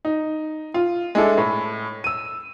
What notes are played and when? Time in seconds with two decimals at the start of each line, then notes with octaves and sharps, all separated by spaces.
0.05 D#4
0.74 F4
1.15 G#3 D4 E4 A4
1.38 A2
2.04 E6 D#7